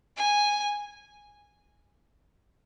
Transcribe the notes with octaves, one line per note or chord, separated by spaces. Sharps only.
G#5